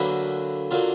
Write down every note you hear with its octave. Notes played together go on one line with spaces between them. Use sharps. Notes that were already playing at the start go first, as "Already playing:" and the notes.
Already playing: D2 D3 F#3 A#3 B4
D3 F#3 A#3 F4